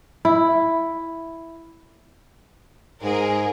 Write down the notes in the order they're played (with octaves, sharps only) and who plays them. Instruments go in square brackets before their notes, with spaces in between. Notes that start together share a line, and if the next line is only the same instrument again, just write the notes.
[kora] E4
[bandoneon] G#2 [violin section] G#4 A#4